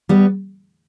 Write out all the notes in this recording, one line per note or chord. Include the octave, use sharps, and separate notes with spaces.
G3 B3